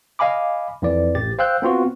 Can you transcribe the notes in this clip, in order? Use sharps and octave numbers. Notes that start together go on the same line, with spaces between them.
D#5 F5 G#5 B5 D6
F2 E3 D5
A1 G4 A6
C5 F5 G5 E6 F#6 G6
B3 C4 F4 F#4